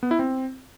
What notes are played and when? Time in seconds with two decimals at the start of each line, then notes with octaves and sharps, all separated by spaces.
0.03 B3
0.11 E4
0.19 C4